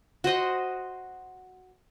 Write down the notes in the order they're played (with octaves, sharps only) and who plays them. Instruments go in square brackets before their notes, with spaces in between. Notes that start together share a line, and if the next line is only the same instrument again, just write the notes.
[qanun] F#4 C5 D#5 F#5